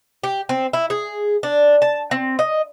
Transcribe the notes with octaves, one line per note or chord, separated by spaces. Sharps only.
G4
C4
E4
G#4
D4
A5
C4
D#5